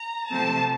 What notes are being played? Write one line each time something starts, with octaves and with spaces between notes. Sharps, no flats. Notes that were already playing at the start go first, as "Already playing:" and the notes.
Already playing: A#5
C3 F3 A3 C4 A5